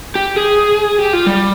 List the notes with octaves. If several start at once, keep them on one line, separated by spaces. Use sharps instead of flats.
G4
G#4
G4
F4
G3